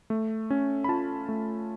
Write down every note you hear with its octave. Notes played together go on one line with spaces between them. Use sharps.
A3
C#4
B5
F4 A5
A3